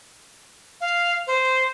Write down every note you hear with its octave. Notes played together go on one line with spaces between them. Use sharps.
F5
C5